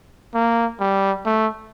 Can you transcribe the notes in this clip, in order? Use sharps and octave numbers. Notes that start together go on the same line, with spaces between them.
A#3
G3
A3